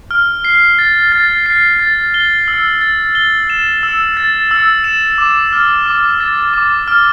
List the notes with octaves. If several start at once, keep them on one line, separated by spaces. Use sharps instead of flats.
F6
C7
A6
A6
C7
A6
G7
E6
A6
G7
E7
E6
A6
E6
E7
D6
F6
D6
A6
D6
F6